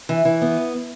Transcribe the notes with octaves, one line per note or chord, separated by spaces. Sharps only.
E3
E3
B3